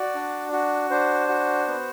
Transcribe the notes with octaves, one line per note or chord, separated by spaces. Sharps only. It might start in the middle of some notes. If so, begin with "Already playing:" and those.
Already playing: F#4 D5
D4
F#4
D4 C5
F#4
B3